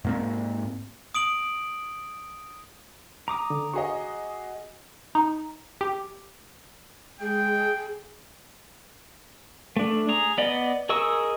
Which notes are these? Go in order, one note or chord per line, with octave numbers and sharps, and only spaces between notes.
G#2 A#3 C4
D#6 D7 F#7
A#5 D6 D#6
D3
F#4 G#4 D#5 C#6
D#4
G4
G#3 G#4 G5
A3 D4
G#4 A#5
B3 D5 D#5
G#4 A#4 D#5 C#6 E6